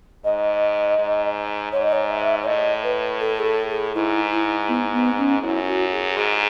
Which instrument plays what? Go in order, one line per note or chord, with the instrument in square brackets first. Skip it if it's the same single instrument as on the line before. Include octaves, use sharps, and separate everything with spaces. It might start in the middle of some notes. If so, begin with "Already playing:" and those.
[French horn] G#2 [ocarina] D#5
[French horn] G#2
[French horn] G#2 [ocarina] C#5
[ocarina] D#5
C#5
E5
C#5
[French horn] A2 [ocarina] D#5
[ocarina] B4
A4
G#4
A4
G#4
[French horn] G#2 [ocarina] E4
[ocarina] E4
B3
B3
C#4
[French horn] F#2 [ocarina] E4
[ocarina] F#4
G#4
[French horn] G#2 [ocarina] G#4